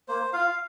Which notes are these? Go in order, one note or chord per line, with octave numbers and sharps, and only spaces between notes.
A#3 C5
F4 F5